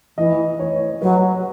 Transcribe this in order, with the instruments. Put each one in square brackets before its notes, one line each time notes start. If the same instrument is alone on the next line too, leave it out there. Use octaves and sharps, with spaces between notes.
[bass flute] E3 [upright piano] D#5
[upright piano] C#5
[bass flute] F#3 [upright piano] B4